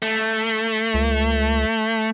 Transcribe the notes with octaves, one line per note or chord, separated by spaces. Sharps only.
A3
C#2